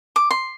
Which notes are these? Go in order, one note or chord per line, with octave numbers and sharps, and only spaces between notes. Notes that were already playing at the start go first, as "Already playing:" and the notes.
D6
C6